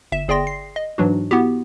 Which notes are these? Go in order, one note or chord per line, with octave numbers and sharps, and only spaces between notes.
G1 E5 E7
G1 G#4 D5 G5 C6 A#6
C7
D#5
G#2 E3 F#3 D4 F#4
B3 E4 F#4 G4